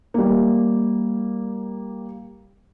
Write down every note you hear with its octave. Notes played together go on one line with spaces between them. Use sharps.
G3 A#3